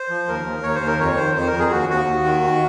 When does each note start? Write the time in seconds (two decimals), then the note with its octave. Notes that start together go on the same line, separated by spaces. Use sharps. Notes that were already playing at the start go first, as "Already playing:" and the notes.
Already playing: C5
0.09 F3
0.28 D#2 A#4
0.46 D#2
0.63 D#2 C#5
0.75 C5
0.82 D#2
0.87 A#4
0.99 F2 C#5
1.17 D#3 C5
1.35 F2 C5
1.47 A#4
1.53 F2
1.59 G#4
1.71 D#2 F#4
1.89 D#2 F#4
2.07 D#2
2.24 D#3
2.42 D#3